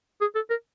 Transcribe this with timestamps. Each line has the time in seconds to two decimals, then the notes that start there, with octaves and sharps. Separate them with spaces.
0.21 G#4
0.35 A4
0.50 A#4